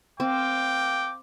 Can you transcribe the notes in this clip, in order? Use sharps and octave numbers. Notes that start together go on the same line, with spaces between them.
C4 F5 G5 D6